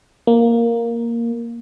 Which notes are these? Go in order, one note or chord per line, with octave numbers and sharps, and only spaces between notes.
A#3